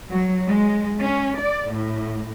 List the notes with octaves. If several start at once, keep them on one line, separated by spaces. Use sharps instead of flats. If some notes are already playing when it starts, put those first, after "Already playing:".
F#3
G#3
C#4
D5
A2